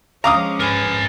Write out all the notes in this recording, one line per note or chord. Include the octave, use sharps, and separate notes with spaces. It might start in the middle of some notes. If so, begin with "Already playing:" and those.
F3 G#3 C#4 F5 A#5 D6 D#6
A#4 B4 G#5